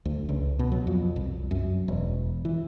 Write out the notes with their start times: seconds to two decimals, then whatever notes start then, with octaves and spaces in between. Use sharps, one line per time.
0.05 D2
0.29 C#2
0.59 B2
0.72 F#3
0.87 F2
1.16 C2
1.51 F#2
1.88 E1
2.45 E3